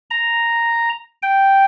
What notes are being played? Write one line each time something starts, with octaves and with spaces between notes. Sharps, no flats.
A#5
G5